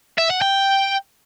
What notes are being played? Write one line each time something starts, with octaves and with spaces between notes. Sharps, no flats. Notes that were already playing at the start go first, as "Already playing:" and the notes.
E5
F#5
G5